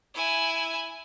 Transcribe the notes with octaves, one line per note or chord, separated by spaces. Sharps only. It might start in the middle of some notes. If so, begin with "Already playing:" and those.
E4 G#5